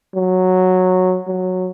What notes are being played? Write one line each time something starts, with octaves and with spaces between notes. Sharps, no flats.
F#3
F#3